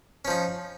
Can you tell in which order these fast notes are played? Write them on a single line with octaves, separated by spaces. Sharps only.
C#4 F3 D#4